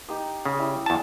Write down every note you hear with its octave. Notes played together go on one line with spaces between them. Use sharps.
D#4 G4 D#6
C#3
G3 E4 E5
E2 A5